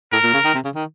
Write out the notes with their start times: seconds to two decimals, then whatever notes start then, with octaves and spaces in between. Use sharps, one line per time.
0.12 A2 A#4
0.23 A#2
0.33 C#3
0.44 D#3
0.54 C3
0.65 C#3
0.75 D#3